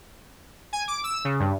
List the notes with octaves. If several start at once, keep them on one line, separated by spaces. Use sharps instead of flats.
G#5
D6
E6
C#3
G2